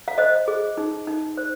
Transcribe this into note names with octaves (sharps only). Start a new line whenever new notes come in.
F5
C5 D#5
G#4
D#4
D#4
C5